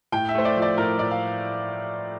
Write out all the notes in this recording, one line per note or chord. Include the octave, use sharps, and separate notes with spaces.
A2 G5
E5
A3 C5
D5
F3
D5
A2 A#4
A2 D5
F5